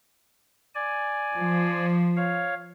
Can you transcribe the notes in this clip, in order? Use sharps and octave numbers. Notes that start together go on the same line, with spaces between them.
D5 G#5
F3
C#5 F5